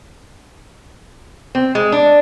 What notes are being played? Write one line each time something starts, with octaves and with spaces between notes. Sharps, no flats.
C4
G#3
D4